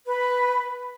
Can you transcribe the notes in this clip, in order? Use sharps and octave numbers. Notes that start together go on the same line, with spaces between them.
B4